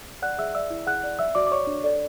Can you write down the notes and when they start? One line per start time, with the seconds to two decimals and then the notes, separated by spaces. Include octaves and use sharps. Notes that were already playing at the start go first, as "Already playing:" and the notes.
0.22 D5 F#5 F#6
0.38 G#4 E5 E6
0.55 D5 E5 E6
0.70 E4
0.87 G#4 F#5 F#6
1.03 D5
1.19 D5 E5 E6
1.35 F#4 D5 D6
1.47 D6
1.51 C#5 D5 C#6
1.67 D4
1.84 A4 D5